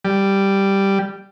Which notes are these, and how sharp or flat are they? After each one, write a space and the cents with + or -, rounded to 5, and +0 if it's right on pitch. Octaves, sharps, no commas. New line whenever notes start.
G3 +0